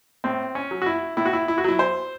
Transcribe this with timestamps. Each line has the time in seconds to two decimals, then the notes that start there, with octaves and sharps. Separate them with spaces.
0.24 A2 C4
0.55 C#4
0.71 F#3
0.82 F#4
0.86 E4
1.17 A2 E4
1.25 F#4
1.33 E4
1.48 E4
1.58 F#4
1.64 F#3 E4
1.79 C5